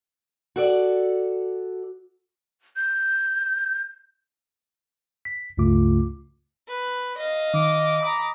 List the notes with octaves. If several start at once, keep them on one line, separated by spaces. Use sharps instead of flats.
F#4 A4 D5
G6
B6
C#2 G2 C#3 A3 F4 D6
B4
D#5 F5
D#3 D6
A#5 B5 D#6